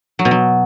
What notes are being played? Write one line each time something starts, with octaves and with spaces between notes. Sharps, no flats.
F#3
B2
F#3